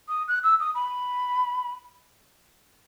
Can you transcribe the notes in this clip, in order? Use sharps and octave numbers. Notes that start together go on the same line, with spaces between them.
D#6
F#6
E6
D#6
B5